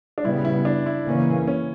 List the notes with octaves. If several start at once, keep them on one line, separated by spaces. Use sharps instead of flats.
D4
C#3 G3 B3 E4
E4
D4
E4
C#3 E3 A#3 C#4
C#4